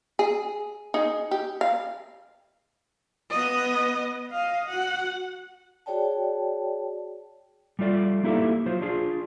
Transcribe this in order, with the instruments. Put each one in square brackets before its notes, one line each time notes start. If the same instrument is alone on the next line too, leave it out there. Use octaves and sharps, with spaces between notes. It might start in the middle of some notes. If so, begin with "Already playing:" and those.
[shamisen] G#4
D#4 G#4
G4
F5
[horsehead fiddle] B3 D#5
D#5 F5
F#4 F#5
[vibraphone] F#4 G#4 C#5 D5 G5 A5
[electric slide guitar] G3 A3 F4 D5
A#3 D#4 E4 G4 A4
F#3 F4 C5
D4 F4 G#4